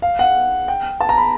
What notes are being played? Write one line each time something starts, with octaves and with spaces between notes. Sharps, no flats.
F5
F#5
G5
A5
A#5
B5